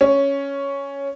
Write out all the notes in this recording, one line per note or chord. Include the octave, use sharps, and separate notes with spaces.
C#4